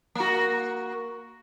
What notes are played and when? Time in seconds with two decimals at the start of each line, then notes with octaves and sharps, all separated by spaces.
0.15 A#3 F#4